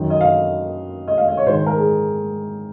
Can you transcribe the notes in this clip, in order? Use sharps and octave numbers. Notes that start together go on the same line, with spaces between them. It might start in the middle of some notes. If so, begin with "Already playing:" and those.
Already playing: F#2 D#3
D#5
F5
D#5
F5
D#5
C#5
G#2 D#3 C5
C5
A#4
G#4